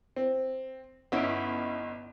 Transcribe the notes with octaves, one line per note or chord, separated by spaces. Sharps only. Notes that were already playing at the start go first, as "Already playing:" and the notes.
C4
G1 B3 C#4 D#4 E4 D7